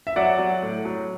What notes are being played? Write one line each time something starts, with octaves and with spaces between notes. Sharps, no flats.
E5
F#3 D5 F#5
F#3
A2
F#3